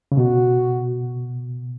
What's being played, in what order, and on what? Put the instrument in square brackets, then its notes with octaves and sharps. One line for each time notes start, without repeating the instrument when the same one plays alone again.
[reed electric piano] C#3
[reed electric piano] B2 [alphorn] F#4